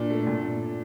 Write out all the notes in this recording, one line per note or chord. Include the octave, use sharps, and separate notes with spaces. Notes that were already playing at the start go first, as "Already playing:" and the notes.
Already playing: A#2 D4
A3
A#2